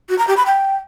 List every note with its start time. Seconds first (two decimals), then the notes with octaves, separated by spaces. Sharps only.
0.09 F#4
0.18 A#5
0.28 G4
0.37 B5
0.46 G5